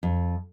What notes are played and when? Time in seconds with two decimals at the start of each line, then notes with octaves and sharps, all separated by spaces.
0.03 F2